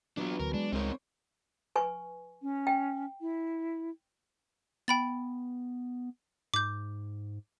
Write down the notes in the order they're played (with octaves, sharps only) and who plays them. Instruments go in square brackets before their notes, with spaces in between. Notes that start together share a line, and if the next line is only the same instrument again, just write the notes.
[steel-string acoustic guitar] E3 F#3 B3 [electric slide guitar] D4 F4
[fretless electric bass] D2 [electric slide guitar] A#4
[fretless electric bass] G#3 [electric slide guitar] D4
[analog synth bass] C#2 [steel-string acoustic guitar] G3 C5 C#5 [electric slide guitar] C4 D#4 A#4
[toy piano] B4 G#5 C#6
[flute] C#4
[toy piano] G5
[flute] E4
[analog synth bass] B3 [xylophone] G5 B5 A6
[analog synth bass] G#2 [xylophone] D6 G6